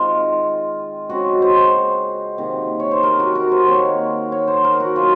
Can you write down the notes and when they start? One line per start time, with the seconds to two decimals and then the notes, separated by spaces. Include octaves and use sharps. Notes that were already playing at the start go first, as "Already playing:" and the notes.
Already playing: D#3 G#3 C4 F4
1.09 C#3 G#3 C4 F#4
1.42 C5
2.38 C3 D#3 A#3
2.80 C#5
2.91 C5
3.03 A#4
3.19 F#4
3.35 A#4
3.52 C5
3.67 D#3 A#3 C#5
4.32 C#5
4.48 C5
4.64 A#4
4.80 F#4
4.96 C3 F#3 C4 F4